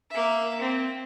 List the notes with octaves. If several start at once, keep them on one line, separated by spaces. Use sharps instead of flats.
A#3 E5
C4